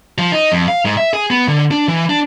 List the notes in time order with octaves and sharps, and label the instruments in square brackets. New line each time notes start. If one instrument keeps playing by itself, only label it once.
[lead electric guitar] F3
D#4
F2
F5
G#2
E5
G#4
B3
D3
D4
E3
D4